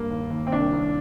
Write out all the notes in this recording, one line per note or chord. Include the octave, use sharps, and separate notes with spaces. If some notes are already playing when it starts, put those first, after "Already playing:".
Already playing: G2 A#3
D#2
D#2
C4
C2 D4
C2